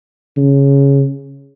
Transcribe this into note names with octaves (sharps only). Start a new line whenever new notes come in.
C#3